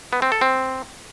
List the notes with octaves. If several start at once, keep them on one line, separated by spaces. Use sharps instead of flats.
B3
C4
A4
C4